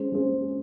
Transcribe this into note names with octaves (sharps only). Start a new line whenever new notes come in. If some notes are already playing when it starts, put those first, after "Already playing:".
Already playing: G#3 C#4 G#4 C5
G#3 C#4 G#4 C5